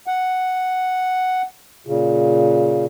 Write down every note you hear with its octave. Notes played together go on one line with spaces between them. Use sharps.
F#5
A#2 C#3